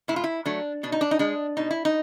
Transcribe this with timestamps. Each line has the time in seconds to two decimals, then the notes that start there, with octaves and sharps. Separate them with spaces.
0.08 A2 E4
0.16 F4
0.24 E4
0.46 F#3 A3 D4
0.83 B2 D4
0.92 D#4
1.01 D4
1.11 D#4
1.19 G#3 D4
1.57 B2 D#4
1.71 E4
1.85 D#4